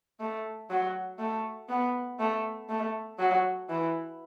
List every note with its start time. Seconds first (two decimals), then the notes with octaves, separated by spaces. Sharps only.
0.20 A3
0.70 F#3
1.19 A3
1.69 B3
2.19 A3
2.69 A3
3.19 F#3
3.69 E3